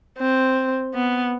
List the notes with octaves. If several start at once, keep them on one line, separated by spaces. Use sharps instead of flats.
C4
B3